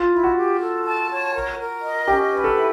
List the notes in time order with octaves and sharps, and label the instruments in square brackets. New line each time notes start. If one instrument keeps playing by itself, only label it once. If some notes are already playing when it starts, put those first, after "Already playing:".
Already playing: [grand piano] F4
[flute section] E4
[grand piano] F#4
[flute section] G4
A4
A5
C#5
A#4
A#4
D#5
[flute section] C#4 [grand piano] G4
[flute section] B4
[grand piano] A4
[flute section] E4